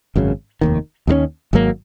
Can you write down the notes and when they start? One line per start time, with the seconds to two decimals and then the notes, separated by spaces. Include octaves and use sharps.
0.16 G#1 F#2 C#3
0.61 F1 D#2 D#3
1.07 D#2 D#3 G#3 C#4
1.53 G#1 G#2 F#3 A#3